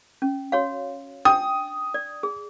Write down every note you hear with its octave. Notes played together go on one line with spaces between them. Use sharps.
C#4
F#4 C#5 F5
D4 G5 D#6
D5
G#4